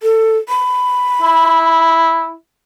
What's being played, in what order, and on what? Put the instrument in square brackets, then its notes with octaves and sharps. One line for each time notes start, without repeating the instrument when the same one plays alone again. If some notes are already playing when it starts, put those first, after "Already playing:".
[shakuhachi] A4
B5
[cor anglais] E4